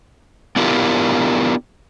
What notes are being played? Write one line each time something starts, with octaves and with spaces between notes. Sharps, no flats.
B3 D4 E4 F4 G4 A#4